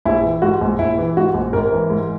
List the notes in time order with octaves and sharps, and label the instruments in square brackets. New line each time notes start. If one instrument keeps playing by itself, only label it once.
[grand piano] A#1 E4
E3
G#2 F#4
A#1
A#1 E4
E3
G#2 F#4
A#1
G#1 A#4
E3
G#2